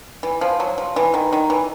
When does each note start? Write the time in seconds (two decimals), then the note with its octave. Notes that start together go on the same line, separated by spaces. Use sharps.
0.23 E3
0.41 F3
0.60 F#3
0.78 F3
0.96 E3
1.14 D#3
1.33 D#3
1.50 E3